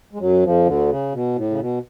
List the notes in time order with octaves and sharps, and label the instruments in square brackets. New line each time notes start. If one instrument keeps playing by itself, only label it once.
[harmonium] G#3
F#2 F#3
F2 F3
D2 D3
C#3
B2
A2
C#3
B2